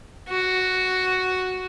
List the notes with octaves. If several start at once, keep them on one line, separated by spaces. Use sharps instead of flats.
F#4